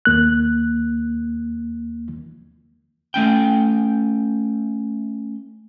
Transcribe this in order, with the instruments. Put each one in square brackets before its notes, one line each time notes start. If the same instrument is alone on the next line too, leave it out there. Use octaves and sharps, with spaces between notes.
[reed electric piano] D#2 A#3 F#6
[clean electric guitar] A3 C#4 G5